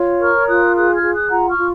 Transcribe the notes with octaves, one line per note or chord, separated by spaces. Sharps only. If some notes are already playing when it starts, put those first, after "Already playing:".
Already playing: F4 C#5
A#4 C#6 F6
F4 D#6 F#6
G#4 D#6 F#6
F6 G#6
G#4
D#6 F#6
F4 F#5 A#5
C#6 F6
F4